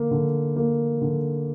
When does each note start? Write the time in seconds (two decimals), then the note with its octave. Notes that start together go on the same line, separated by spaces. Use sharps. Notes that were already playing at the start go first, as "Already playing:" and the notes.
Already playing: D3 A#3
0.11 D3
0.56 A#3
1.01 D3